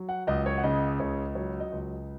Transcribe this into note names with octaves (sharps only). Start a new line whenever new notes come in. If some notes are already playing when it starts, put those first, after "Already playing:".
Already playing: F#3
F#5
C#2 D#5
C#5
F#5
C#3 D#5
C#2 C#5
F#3 C#5
D#5
C#2